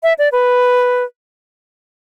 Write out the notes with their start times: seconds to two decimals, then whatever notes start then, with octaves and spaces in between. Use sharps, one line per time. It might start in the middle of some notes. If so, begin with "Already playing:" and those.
0.03 E5
0.18 D5
0.32 B4